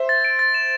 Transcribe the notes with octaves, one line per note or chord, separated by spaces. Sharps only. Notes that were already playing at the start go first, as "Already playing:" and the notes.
Already playing: C5 E5
A6
D7
A6
E7